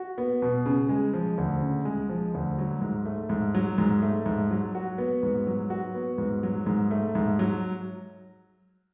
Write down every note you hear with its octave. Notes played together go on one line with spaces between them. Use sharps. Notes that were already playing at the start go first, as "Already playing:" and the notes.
Already playing: F#4
B3
B2
C#3
G#3
F3
D2
C#3
G#3
F3
D2
F#3
G#2
A3
G#2
F#3
G#2
A3
G#2
F#3
F#4
B3
G#2
F#3
F#4
B3
G#2
F#3
G#2
A3
G#2
F#3